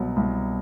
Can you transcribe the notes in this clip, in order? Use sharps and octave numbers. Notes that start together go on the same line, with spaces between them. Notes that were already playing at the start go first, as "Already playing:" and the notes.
Already playing: C2 B2 F#3
C2